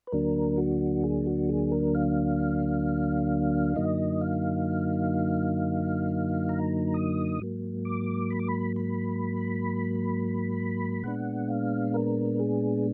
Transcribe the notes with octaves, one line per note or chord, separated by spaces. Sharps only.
B4
D2 D3 F#3 A#3 D4 A#4
F#4
G#4
F#4
G#4
A#4
F5
F#2 D3 F#3 A#3 D#4 D#5
F5
A#5
D#6
G#2 F#3 A#3
D6
B5
D6
B5
B5
A#2 G#3 B3 D4 F#5
F5
A#4
G#4